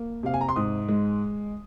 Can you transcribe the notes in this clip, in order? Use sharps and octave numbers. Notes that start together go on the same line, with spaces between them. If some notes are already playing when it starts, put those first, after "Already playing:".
Already playing: A#3
C3 F5
G#5
A#5
C6
G#2 D#6
G#3